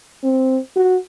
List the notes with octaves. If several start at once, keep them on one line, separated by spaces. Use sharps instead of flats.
C4
F#4